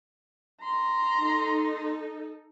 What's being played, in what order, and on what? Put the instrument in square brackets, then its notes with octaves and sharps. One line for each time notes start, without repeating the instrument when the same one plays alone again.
[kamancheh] A#5 C6
[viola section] D#4 A4